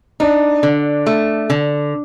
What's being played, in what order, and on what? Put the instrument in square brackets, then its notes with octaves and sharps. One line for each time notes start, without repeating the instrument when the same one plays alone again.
[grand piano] D4 [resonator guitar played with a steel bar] D#4
[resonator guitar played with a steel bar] D3
A3
D3